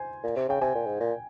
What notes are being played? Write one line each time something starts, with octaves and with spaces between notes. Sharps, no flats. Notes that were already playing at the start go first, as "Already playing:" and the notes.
Already playing: C5 G#5
A#2
C3
C#3 G5
C3 G#5
A#2
G#2
A#2